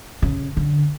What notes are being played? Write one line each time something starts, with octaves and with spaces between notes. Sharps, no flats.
C#3
D3